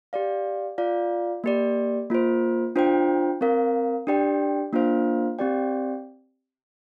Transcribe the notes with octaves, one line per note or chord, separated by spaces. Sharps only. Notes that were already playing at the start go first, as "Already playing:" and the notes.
G4 D5 F5
F4 D5 F5
A#3 G4 D5
A#3 F4 C5
D4 F4 C5 G5
C4 A#4 F5
D4 G4 D5 G5
A#3 D4 F4 C5 F5
C4 G4 D5 G5